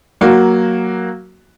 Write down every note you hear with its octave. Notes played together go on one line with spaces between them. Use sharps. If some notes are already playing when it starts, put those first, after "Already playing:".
F#3 A#3 F#4